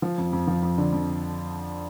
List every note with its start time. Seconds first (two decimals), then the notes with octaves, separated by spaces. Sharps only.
0.02 F3
0.18 F2
0.33 F2
0.47 F3
0.63 F2
0.78 D3
0.93 F2